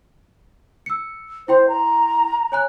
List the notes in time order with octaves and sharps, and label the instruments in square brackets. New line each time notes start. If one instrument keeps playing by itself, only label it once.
[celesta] E6 C#7
[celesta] E4 G5 C6 [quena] C5
[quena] A#5
[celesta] C#5 G#5 F#6